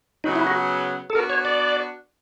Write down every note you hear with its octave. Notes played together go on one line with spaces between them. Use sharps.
C#3 F#3 B3 D#4
E4
F#4
A4
B3 D4 F#4 A#4
C#5
D5